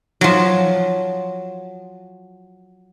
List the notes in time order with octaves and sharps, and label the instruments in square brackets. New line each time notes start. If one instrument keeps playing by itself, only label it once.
[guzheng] F3 F#3